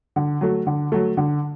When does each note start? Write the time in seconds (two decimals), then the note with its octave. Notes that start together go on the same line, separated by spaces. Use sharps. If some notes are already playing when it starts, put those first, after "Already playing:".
0.16 D3
0.41 F#3 A3
0.67 D3
0.92 F#3 A3
1.17 D3